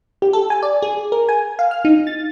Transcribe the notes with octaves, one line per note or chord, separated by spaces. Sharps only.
G4
A4
G#5
D5
G#4
A#4
G#5
F5
F6
D#4
A6